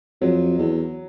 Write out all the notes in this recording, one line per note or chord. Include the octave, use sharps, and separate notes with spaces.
F2 F#3
E2